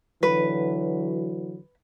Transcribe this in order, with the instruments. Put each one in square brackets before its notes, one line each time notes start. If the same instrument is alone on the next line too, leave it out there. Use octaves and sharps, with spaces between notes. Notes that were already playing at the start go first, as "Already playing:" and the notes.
[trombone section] D3 E3 F#3 [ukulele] B4